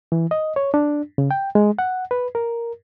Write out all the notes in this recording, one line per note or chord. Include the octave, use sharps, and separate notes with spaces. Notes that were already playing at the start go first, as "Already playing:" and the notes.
E3
D#5
C#5
D4
C#3
G5
G#3
F#5
B4
A#4